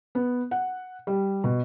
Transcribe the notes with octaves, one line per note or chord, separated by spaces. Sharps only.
B3
F#5
G3
B2